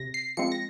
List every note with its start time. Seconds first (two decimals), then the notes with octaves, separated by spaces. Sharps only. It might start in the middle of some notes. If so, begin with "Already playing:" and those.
Already playing: C3 A#6
0.14 C7
0.37 F3 G#3 C4 C#7
0.52 A#6